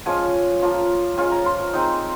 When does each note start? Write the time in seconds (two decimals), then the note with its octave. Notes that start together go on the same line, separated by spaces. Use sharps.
0.06 F3 G#3 C#4 F4 G#5
0.62 F3 A#3 F4
1.17 G#3 C#4 F4 G#5
1.32 A#5
1.46 C6
1.73 G#3 C4 D#4